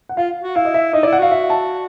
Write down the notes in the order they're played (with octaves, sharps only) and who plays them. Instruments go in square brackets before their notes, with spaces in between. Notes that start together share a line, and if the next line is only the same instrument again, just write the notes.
[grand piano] F#5
[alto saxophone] F4 [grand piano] F5
[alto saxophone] F#4
[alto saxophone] E4 [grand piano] F5
[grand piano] D#5
E5
[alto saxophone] D#4 [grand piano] D#5
[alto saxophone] E4 [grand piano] D5
[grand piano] F#5
[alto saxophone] F#4 [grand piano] F5
[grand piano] E5
A5